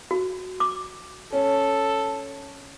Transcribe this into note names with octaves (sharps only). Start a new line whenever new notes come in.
F#4
D6
C#4 A4